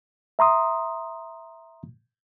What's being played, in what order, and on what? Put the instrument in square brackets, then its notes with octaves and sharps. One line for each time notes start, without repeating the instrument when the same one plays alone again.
[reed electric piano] E5 A#5 C6 D#6